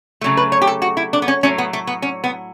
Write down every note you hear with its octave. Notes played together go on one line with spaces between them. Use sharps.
C#3 F#3 A3
B4
C#5
G4
A4
F#4
E4
D4
B3
C#4
A2 F#3 A3 C#4
B3
A3
B3
C#4
B3